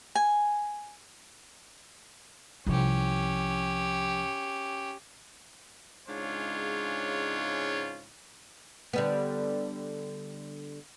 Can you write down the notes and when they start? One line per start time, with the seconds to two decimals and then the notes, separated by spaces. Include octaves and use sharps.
0.15 G#5
2.66 C2 F3 C#4 G4
6.08 G#2 C#3 G#3 D4 F4 C#5
8.93 D3 G3 B3